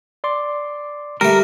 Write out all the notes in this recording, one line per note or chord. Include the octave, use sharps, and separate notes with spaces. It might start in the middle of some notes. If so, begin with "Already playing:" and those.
D5 C6 D6
G3 A3 A#4